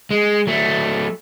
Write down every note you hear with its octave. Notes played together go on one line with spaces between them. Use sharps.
G#3
F#3 A3